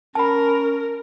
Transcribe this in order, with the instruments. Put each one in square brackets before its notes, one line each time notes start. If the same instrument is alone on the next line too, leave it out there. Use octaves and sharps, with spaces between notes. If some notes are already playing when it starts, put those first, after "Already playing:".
[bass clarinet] C#4 [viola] A#4 [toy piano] A5 B5